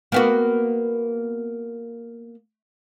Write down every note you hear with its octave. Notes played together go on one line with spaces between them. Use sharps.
A#3 B3 F#4